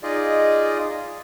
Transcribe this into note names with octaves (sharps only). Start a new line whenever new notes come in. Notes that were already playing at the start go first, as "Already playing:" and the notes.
D#4 F4 G#4 D5 D#5